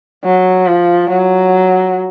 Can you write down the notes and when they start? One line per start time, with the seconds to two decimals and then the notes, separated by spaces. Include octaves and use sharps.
0.24 F#3
0.67 F3
1.10 F#3